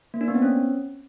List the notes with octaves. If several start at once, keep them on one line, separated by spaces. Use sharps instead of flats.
A#3
D4
B3
C4
C#4